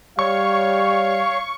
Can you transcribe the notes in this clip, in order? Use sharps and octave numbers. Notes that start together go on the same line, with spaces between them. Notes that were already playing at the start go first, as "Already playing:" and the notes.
G3 C#5 F5 C#6